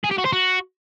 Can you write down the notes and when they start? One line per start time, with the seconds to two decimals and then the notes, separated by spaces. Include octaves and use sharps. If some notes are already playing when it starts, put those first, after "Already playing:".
0.04 G#4
0.11 G4
0.18 F#4
0.25 C5
0.32 F#4